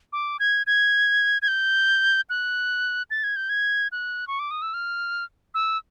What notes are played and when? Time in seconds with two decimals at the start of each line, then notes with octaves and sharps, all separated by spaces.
0.13 D6
0.40 G#6
0.67 G#6
1.42 G#6
1.48 G6
2.30 F#6
3.11 A6
3.24 G#6
3.36 G6
3.49 G#6
3.92 F#6
4.28 C#6
4.39 D6
4.51 D#6
4.62 E6
4.74 F6
5.54 E6